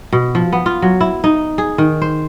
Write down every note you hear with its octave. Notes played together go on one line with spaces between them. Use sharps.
B2
F3
B3
F4
F#3
E4
D#4
G#4
D#3
C5